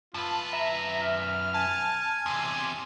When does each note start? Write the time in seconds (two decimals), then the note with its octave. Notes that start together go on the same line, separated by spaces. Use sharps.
0.14 F#2 F4 B4 A5
0.53 E5 A#5
1.03 F6
1.54 G#5 A5
2.26 E2 C3 C6